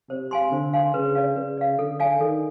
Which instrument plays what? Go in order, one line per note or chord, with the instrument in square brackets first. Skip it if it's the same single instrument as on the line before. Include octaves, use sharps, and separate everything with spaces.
[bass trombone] C3 [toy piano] C5
[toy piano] F5 G#5 C6
[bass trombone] D3 [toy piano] C5
[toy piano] F5 G#5 C6
[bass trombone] C#3 [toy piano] B4
[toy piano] D5 F5
[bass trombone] C#3 [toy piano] B4
[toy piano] D5 F5
[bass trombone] D3 [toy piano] A4
[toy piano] D5 F5 G#5
[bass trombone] D#3 [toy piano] A4